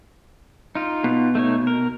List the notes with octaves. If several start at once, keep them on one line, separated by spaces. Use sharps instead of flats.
D#4 F4
B2
A3 D#4 C#5
A#4